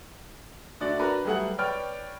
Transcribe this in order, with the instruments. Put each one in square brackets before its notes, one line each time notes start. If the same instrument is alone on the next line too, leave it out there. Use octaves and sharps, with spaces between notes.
[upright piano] D3 A3 F#4 D5
D4 F#4 A#4 B4
F#3 G3 A3 G#4 B4 F#5
B4 C#5 D5 G5 F6